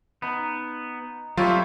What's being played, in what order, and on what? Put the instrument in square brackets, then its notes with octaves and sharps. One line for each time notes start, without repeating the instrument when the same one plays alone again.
[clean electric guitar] B3 [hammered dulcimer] D#4
[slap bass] F#3 [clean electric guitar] G3 A3 C4 [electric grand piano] F4 [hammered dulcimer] C#5 D#5